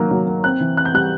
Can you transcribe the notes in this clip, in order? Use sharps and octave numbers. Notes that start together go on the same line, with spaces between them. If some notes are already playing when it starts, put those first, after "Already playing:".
Already playing: D#3 F#3 A#3
F#3
A#3
C4 F#6
E3
C4 F#6
G6
G3 F#6